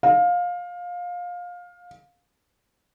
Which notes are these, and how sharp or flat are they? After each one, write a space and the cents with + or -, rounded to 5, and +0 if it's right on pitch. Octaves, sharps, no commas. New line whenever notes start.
F5 +20